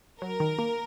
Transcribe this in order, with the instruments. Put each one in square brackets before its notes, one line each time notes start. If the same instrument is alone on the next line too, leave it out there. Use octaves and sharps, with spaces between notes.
[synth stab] F#3 [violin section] A#4
[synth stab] D#3
A#3